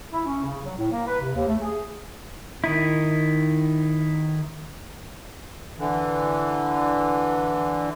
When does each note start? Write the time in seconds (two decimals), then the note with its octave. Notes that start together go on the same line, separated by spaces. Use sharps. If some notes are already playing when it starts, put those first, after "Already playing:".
0.13 E4
0.25 C#4
0.43 C#3
0.64 F#3
0.77 A2
0.91 A#3
1.07 B4
1.21 C3
1.34 D#2
1.47 A3
1.61 G#4
2.64 D#3 D#4 E4
5.79 D3 E3